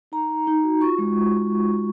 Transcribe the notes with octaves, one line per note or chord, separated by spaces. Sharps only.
D#4 A#5
D#4
D#4
F#4
F4 C#6
G#3